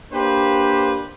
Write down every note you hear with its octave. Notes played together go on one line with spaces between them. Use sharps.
A#3 D4 G4 B4 C5